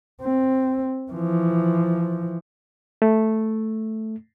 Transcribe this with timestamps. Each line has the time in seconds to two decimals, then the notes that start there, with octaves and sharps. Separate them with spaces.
0.21 C4
1.12 E3 F3
3.02 A3